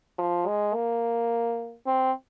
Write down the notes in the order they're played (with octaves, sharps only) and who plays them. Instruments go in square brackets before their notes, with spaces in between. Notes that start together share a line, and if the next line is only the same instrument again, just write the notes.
[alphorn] F3
G#3
A#3
C4